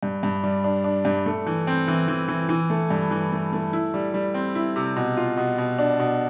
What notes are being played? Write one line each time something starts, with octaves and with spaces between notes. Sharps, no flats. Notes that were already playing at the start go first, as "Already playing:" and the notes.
G2
G2
G3
D4
D4
G2
A3
E3
C4
E3
E3
E3
E3
A3
G2
E3
A3
A3
E4
G3
G3
C4
E4
C3
B2
F4
B2
B2
D4
B2